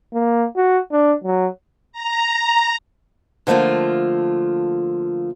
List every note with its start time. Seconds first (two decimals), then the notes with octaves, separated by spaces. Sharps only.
0.13 A#3
0.56 F#4
0.92 D4
1.24 F#3
1.92 A#5
3.47 D3 F3 A3 A#3 F4